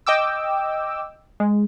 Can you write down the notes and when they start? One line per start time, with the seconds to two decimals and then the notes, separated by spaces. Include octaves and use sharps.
0.07 D#5 G5 D6 E6
1.40 G#3